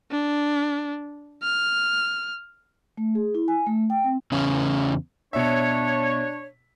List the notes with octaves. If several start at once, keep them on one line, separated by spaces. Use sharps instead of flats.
D4
F6
A3
G#4
E4
G#5
A3
G5
C4
E2 C#3 C#4
B2 D4 C#5 E5